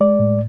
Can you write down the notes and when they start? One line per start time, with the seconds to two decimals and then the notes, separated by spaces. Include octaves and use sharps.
0.01 G#3 D5
0.19 A2